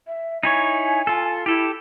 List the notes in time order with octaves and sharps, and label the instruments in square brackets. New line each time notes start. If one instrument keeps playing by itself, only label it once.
[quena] E5
[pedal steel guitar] D#4 E4 C#5 [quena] G#5
[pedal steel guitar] F4 A4
[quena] E4 [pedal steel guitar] G4 A4